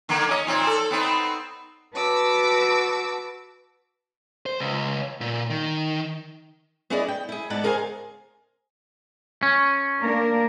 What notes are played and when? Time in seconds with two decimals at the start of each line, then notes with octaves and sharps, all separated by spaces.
0.09 D3 A#3
0.29 C#4 D#5
0.47 A#2 C4 D#4
0.67 A4
0.91 B3 C4 D#4
1.94 F#4 B4 A5 D6 E6
4.46 C5
4.60 C#2
5.21 A#2
5.50 D#3
6.90 B3 C#4 E4 G#4 D5 D#5
7.08 G5
7.29 E4 G#4
7.50 G#2 B3 D5 F#5 A5
7.64 G#4 A#4 C5 F5 G5 G#5
9.43 C#4
10.00 A#3 D4 A#4